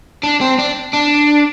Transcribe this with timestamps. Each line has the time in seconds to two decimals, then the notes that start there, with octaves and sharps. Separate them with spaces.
0.23 D4
0.41 C4
0.58 D4
0.93 D4